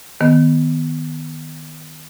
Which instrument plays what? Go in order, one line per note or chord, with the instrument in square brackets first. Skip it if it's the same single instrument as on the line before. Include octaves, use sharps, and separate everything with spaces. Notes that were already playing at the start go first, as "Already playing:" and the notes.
[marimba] D#3 B3